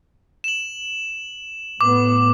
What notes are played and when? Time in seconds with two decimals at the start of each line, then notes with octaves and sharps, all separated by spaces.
0.44 E7 F#7
1.81 A2 B3 D6